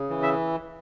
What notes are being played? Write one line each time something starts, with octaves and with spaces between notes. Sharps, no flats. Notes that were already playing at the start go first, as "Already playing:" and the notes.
Already playing: C#3
E3
E5